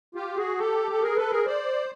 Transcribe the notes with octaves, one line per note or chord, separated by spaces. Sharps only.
F4 G4
F#4 G#4
G4 A4
A4
G#4 A#4
A4 B4
G#4 A#4
C5 D5